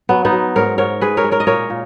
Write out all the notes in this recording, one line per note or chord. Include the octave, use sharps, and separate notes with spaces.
F#3 B3
B3 D#4
F#3
G#2 A#4 C#5
G#2 A#4 C#5
G#3 G#4 B4
A#4 C#5
G#3
A#4 C#5
D#5
A#2 A#4 C#5
A#2